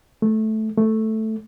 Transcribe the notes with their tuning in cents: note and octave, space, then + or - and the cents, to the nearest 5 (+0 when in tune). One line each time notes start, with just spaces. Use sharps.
A3 -10
A3 +0